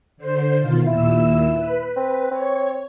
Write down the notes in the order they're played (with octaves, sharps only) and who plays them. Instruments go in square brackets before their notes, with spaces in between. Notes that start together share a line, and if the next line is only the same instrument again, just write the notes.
[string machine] D3 C5
B2 D#3 F4
[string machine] D#2 A#2 E6 [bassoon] E4
[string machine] B4
[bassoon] C4 [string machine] B4
[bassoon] C4 [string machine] C#5